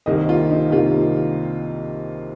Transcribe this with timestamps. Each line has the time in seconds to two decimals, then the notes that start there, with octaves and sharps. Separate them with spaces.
0.06 C2 C3 D#3 A#3 D#5
0.29 F4
0.51 D#4
0.71 C2 C3 D#3 A#3 F4